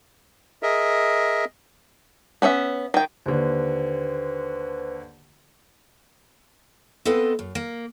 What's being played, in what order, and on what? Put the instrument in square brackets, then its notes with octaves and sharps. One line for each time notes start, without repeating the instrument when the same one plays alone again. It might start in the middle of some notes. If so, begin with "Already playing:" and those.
[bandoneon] G#4 A#4 D#5 E5
[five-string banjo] B3 C#4 C5 E5
D#3 G5
[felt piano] D#2 D3 [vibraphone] B4 C5
[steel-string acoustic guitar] B3 C4 A4 B4 D#5 F5
F#2
A#3